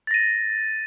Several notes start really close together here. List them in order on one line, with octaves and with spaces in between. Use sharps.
A6 A#6 D#7